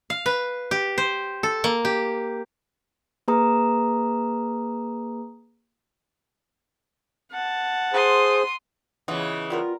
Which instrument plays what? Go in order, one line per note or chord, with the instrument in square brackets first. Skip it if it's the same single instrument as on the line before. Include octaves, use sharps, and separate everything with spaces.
[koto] F5
B4
G4
C5
A4
A#3
G4
[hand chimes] A#3 G#4 B4 A#5 D#6
[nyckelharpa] F#5 A5
[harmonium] G#4 C5 [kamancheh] C6 D#6
[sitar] C#3 E3 [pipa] B3 F4 D#5
[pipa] G3 B3 A#4 [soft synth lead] F4